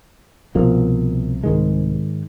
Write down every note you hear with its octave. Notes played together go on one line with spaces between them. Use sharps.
C2 B2 F3 A#3
G#2 D#3 G#3